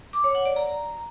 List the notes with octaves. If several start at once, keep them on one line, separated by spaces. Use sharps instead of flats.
D6
C#5
F#5
D5
A#5